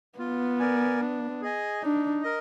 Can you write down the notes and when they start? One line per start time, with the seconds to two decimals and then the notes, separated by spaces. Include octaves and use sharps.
0.19 B3 F4
0.60 A#4 D5 G#5
1.01 D4
1.41 G#4 D#5 G#5
1.82 D4 D#4
2.23 A#4 D#5